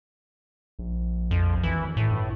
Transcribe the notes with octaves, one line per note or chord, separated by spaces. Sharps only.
A#1
F2
G#1 E3
A2
G2